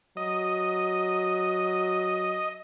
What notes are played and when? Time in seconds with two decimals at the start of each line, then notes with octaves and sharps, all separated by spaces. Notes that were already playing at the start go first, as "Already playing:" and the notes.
0.17 F#3 D#5